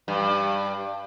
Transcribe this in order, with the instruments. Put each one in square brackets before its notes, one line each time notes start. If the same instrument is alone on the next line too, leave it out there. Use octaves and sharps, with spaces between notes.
[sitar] G2